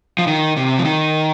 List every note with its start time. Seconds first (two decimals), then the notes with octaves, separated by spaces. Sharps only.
0.18 F3
0.27 D#3
0.57 C3
0.79 F3
0.85 D#3